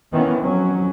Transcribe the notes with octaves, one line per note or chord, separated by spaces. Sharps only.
D#3 E3 B3 C#4
F2 F#3 C#4